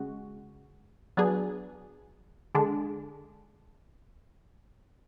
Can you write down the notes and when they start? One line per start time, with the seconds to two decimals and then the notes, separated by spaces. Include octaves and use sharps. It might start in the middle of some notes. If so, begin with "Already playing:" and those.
Already playing: C#3 G#3 F#4
1.17 F#3 B3 D4 G#4
2.55 D3 G#3 D4